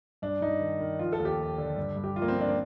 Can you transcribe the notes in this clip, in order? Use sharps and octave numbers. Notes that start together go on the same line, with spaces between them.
G2 D4
G2 D#4
D#3
D#3
F3 F4
A4
D#2
G4
D#2
D3
G2
G2
G4
F3 F4
A#3
C4
F3
D4
C4